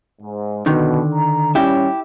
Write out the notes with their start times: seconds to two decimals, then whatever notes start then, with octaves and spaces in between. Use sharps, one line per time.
0.21 G#2
0.66 B2 D3 D#3
1.14 A#5
1.55 D#3 G3 C#4 E4 G4